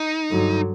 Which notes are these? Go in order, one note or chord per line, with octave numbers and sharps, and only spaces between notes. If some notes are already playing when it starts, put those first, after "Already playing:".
Already playing: D#4
G2 D3 F#3